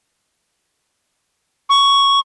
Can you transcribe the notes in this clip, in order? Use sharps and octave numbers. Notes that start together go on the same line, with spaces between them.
C#6